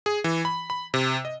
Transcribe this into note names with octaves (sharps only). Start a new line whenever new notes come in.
G#4
E3
B5
B5
C3
D#5